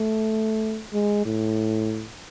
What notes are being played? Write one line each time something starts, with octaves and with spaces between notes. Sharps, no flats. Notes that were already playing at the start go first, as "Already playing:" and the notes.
Already playing: A3
G#3
A2